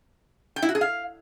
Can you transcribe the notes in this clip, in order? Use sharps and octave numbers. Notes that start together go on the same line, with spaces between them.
G5
E4
F#4
G#4
F5